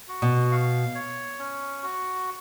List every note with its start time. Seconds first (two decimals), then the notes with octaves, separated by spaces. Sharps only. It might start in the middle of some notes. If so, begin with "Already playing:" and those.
0.08 F#4
0.22 B2
0.52 F5
0.95 C#5
1.39 C#4
1.83 F#4